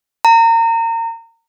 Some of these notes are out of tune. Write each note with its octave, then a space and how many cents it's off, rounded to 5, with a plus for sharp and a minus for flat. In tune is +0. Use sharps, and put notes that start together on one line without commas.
A#5 -30